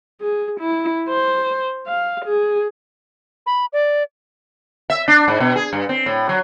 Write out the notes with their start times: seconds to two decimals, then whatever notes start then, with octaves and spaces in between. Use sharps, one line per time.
0.21 G#4
0.60 E4
1.09 C5
1.87 F5
2.25 G#4
3.46 B5
3.73 D5
4.90 E5
5.08 D4
5.28 G#2
5.40 B2
5.56 G#4
5.73 G2
5.89 C4
6.06 A2
6.29 F#3